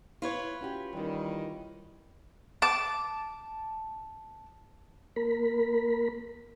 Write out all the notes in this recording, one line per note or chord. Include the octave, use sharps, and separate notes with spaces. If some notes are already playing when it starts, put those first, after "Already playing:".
E4 F4 B4 C#5
C#4 F#4 G4
D#3 E3 G3 C#4
A5 D6
A#3 A#4 B5